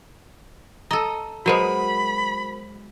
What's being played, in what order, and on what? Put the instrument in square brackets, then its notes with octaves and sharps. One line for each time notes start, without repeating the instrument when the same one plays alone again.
[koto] A4 D#5 [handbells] A#5
[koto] F#3 G#3 B3 [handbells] F#4 A#4 C5 [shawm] B5